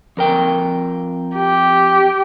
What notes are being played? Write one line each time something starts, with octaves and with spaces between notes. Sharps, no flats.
F2 A#4 G5
G4